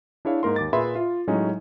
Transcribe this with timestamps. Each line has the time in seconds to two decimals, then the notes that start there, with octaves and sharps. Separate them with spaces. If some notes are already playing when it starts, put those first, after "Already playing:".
0.25 D4 E4 G#4 C#5 F5
0.43 G#2 A#3 A#4 C6
0.56 D#2 D6 A6
0.73 A#2 G#4 B4 E5 B5 C6
0.95 F4
1.27 A2 F#3 G#3 C#4 D#4